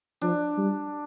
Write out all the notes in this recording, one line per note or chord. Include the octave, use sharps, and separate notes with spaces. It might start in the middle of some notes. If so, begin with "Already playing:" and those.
F3 D4
G3